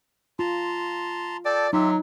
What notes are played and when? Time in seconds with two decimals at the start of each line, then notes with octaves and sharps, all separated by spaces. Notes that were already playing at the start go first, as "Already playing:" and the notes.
0.39 F4 A5 A#5 C6
1.45 A4 D5 G5 A5
1.73 F#3 D#4 F4 G4 E5